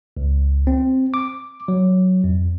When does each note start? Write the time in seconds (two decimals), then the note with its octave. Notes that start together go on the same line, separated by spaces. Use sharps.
0.17 C#2
0.67 C4
1.14 D6
1.68 F#3
2.24 F2